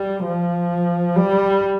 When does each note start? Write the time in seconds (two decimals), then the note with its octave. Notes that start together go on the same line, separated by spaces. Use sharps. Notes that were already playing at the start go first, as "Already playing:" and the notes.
Already playing: G3
0.24 F3
1.16 G3